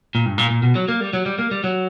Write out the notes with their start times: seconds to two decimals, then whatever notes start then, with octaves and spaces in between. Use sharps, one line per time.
0.15 A#2
0.26 G2
0.38 A#2
0.50 A#2
0.63 B2
0.75 F#3
0.88 A#3
1.01 G3
1.13 F#3
1.26 G3
1.39 A#3
1.51 G3
1.64 F#3